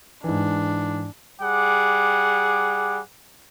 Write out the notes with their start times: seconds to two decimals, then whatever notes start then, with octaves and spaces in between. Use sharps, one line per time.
0.24 G#2 E3 D4
1.41 G3 G#4 F#5 D6